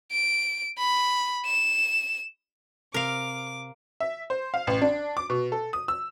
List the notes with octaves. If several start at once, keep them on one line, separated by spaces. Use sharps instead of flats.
D7
B5
E7
C3 A#4 F5 D6
E5
C5
F5
A1
D4
D6
B2
A4
D#6
E6